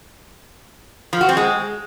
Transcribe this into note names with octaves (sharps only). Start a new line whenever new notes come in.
F3
F#4
C4
G#3